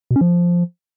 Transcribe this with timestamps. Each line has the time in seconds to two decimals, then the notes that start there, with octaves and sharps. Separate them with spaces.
0.11 B2
0.16 C#4
0.21 F3